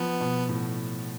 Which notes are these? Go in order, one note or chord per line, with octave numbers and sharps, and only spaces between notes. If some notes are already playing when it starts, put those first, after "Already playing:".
Already playing: F3 B3
B2
A2